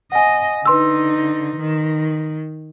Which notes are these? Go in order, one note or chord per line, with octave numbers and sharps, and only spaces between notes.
D#5 F#5 G#5
D3 D#4 B4 C6 E6
D#3